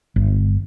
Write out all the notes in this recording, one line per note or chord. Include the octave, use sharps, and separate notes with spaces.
G1